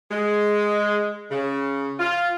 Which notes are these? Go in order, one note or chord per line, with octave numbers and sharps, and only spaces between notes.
G#3
C#3
F4